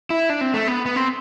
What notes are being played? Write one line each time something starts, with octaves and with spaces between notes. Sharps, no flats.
E4
D4
C4
A3
B3
B3
C4